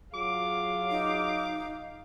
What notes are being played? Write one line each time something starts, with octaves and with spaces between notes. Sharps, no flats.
F#3 F4 G#4 F5 D6
D#4